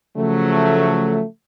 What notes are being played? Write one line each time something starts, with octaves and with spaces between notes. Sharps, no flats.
C#3 F3 F#3 A3